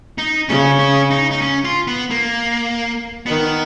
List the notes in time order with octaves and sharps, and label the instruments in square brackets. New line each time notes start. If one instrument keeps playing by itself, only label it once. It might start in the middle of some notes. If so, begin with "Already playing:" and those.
[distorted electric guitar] D#4
[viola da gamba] C#3 [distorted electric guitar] C#4
[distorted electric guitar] C#4
D#4
D#4
C#4
F4
B3
A#3
[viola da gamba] D#3 [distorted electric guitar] B3